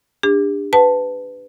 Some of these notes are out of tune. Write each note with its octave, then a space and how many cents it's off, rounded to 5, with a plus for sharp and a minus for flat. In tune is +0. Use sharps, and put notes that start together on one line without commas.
D4 +0 G4 +45
B4 +20 F#5 +0 A5 +0